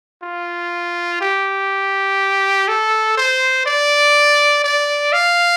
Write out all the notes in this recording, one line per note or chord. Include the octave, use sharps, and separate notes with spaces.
F4
G4
A4
C5
D5
D5
F5